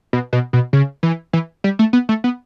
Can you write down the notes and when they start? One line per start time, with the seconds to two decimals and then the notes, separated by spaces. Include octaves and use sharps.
0.13 B2
0.33 B2
0.53 B2
0.73 C#3
1.03 E3
1.33 E3
1.64 G3
1.79 A3
1.93 B3
2.09 A3
2.24 B3